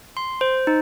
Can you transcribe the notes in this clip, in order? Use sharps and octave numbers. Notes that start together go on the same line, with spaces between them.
C6
C5
D#4